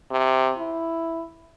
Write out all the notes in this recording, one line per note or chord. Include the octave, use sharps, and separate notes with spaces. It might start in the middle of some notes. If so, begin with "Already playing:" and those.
C3
E4